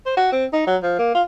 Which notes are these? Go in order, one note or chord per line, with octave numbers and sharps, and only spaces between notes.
C5
F#4
C4
D#4
F#3
F3
A#3
F4